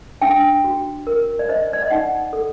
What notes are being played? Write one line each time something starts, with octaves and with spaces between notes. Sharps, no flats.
D4 G5
F#4
A#4
D5
C5 D#5
D5
D#5
D#4 F#5
A4